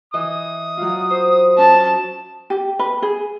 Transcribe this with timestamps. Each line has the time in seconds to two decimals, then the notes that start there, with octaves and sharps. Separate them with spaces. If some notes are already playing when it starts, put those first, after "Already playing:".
0.14 E3 D#5 D#6
0.77 F#3 F4
1.11 C5
1.58 C#4 A5 D#6
2.50 G4
2.79 B4
3.02 G#4